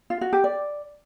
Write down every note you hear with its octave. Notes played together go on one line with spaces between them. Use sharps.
F4
F#4
G4
D5